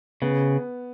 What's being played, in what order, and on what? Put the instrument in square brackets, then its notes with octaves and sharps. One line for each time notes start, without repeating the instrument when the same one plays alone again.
[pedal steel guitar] C#3 [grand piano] B3